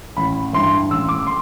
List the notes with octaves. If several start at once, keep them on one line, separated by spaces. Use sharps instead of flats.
A1 B5
G2 E3 C6
A1 E6
D6
C6